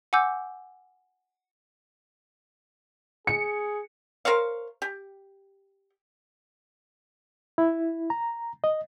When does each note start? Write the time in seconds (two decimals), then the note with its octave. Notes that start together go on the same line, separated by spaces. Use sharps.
0.13 F#5 G#5 D6 E6 G6
3.27 G#4 C#7
4.25 A#4 C5 C#5 F5
4.82 G4
7.58 E4
8.10 A#5
8.64 D#5